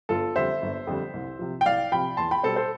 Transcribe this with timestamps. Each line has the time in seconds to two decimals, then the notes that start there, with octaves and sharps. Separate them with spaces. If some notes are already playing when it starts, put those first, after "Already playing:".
0.09 G1 F4 A4
0.35 F2 D3 G3 C5 E5
0.62 G1
0.87 F2 D3 G3
1.13 C2
1.39 C3 F3
1.61 G5
1.66 C2 D5 F5
1.92 C3 F3 G5 B5
2.17 E2 A5 C6
2.31 G5 B5
2.43 B2 G3 A4 C5
2.56 A4 C5